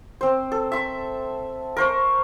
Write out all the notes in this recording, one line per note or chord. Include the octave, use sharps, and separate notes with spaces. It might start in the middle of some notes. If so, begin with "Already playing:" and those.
C4 C5
A4
E5 C6
A#4 C5 C#6